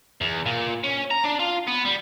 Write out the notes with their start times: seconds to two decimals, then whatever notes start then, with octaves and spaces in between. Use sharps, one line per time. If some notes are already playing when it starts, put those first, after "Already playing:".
0.21 E2
0.46 A#2
0.84 C#4
1.11 A#5
1.24 D4
1.39 F4
1.67 B3
1.85 G3